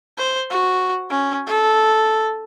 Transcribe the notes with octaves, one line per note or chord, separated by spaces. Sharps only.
C5
F#4
C#4
A4